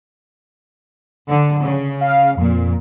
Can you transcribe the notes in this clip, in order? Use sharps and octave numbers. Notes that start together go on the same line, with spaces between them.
D3
C#3
F5
F2 A#2